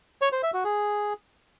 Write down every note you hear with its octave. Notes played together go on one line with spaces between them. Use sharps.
C#5
C5
E5
F#4
G#4